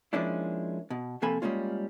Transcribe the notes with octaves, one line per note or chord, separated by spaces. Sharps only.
F3 G#3 A#3 C#4 D4 E4
B2
F2 C3 A#3 A4 G#5 B5
G3 G#3 A#3 C#4 F4